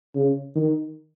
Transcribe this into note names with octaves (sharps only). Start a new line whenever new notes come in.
C#3
D#3